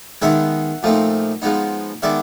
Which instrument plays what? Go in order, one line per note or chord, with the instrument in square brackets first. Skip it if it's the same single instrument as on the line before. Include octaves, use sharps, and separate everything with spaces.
[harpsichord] D#3 G#3 B3 D#4 E5 F#5
A#2 F3 A3 C4 D#4
F3 G#3 B3 D#4
D#3 G#3 B3 D5 E5